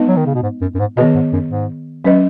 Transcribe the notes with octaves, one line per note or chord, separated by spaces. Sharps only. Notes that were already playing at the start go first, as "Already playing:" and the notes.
Already playing: G#3 B3 D#4 B4 D#5
F#3
D#3
C#3
B2
G#2
F#2
F#2
G#2
B2 D#3 B3 G#4 B4 D#5
G#2
F#2
G#2
F#3 C#4 B4 D#5